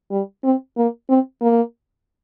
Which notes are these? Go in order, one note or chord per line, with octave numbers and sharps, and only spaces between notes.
G3
C4
A#3
C4
A#3